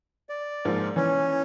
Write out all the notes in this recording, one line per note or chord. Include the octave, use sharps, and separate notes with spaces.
D5
G#2 F3 A#3
E3 C#4